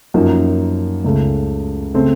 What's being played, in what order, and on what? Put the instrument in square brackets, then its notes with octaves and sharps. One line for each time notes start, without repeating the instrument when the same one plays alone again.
[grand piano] F#2 F3 A#3 D#4
C#2 C#3 A3
C#3 A3 C4